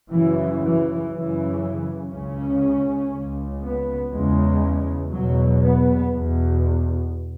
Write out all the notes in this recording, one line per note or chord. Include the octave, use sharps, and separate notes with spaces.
F#2 C#3 E3
E3
F#2 C#3 E3
C#2 C#3 C#4
C#2 C#3
B3
E2 C#3 G#3
E2 B2 F#3
B3
E2 B2